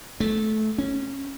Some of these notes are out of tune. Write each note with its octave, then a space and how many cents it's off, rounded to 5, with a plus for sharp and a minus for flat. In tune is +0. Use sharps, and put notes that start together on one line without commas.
A3 -20
C#4 -15